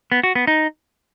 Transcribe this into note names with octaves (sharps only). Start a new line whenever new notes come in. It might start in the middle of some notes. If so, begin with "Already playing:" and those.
B3
F#4
B3
D#4